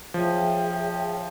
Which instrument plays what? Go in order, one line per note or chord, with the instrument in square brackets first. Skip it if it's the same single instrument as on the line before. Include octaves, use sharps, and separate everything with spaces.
[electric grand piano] F3 [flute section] G#4 C#5 E5 G5